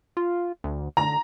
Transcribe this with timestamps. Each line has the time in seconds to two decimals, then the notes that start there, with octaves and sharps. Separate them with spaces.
0.17 F4
0.64 D2
0.97 D3 A#5